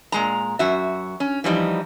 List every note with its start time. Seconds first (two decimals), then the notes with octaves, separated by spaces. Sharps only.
0.12 A#2 G#3 A#5
0.59 F#2 F#4 E5
1.20 C#4
1.44 E3 F3 G3 D#4